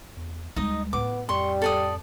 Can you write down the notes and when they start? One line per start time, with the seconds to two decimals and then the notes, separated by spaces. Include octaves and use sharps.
0.17 E2
0.56 D2 G3 G#3 D#4 D#5
0.93 A2 B3 D6
1.29 F2 G3 C6 C#6
1.62 A4 D5 D#6